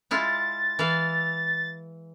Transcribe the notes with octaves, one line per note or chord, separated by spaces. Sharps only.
G#3 E4 F4 A6
E3 E5 F5